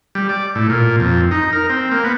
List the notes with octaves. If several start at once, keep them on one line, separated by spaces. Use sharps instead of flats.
G3
D5
A2
A#2
F2
D#4
A#4
C4
A#3
B3